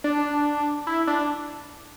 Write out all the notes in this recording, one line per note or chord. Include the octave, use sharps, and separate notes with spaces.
D4
E4
D4